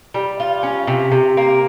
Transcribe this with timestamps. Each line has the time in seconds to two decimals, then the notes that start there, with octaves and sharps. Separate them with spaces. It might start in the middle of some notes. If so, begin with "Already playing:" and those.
0.14 G3
0.40 F4
0.63 C#4
0.87 C3
1.12 C3
1.37 A#3